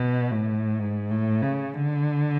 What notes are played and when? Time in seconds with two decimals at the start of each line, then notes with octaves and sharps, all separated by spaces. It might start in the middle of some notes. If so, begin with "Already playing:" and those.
Already playing: B2
0.32 A2
0.79 G#2
1.10 A2
1.42 C#3
1.74 D3